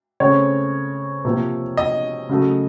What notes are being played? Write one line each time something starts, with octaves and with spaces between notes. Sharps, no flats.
C#3 A3 C4 C#5
C3 F3 A#3
D#5
C#3 F#3 A3